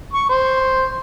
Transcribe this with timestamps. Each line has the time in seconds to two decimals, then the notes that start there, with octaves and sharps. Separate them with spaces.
0.13 C#6
0.29 C5